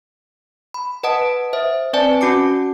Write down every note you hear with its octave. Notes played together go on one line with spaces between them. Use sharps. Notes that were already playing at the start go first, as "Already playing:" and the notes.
B5
B4 D#5 F#5 A5 D#6 D7
C5 E5 D#6
C4 B4 D5 G#5 A5
C#4 F#4 A5 D6 C#7